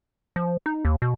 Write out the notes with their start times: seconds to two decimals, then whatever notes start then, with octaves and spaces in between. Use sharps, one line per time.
0.36 F3
0.66 D#4
0.85 D#2
1.02 B2